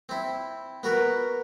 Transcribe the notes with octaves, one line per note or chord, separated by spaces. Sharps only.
C4 E4
B3 F#4 A#4 B4